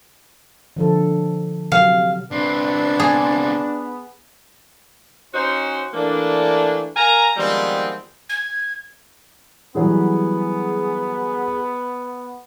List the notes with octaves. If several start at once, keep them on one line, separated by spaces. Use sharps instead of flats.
D3 F3 A4
C3 F#3 F5
C#2 C4 D4 B4
B3 G#4
C#4 D#4 F#4 C5
E3 A3 A#3 D4
A#4 F5 G#5 A#5
D#3 F3 G3 G#3 B3 C4
G#6
E3 F#3 G3 B3 G#4